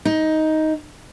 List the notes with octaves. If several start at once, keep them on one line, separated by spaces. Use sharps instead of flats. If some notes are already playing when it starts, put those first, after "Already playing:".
D#4